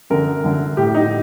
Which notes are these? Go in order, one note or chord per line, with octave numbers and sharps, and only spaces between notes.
F#2 D3 A#4
F#2 D3
A2 G4
D#4